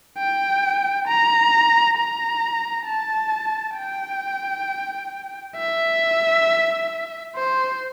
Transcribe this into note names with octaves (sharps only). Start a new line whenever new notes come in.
G5
A#5
A#5
A5
G5
E5
C5